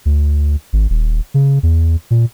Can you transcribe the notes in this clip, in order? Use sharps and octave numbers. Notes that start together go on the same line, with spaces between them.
D2
G#1
D#1
C#3
E2
A#2